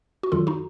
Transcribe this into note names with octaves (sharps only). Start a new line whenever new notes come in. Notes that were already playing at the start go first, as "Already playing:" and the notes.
F#4
F#2 D#3 F#3 F4 A4
D#4 F#4